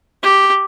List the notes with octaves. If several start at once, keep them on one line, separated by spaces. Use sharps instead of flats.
G4